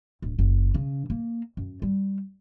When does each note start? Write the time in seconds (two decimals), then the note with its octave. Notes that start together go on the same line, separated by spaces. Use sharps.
0.22 D1
0.39 F#1
0.74 C#3
1.10 A#3
1.57 F#2
1.82 G3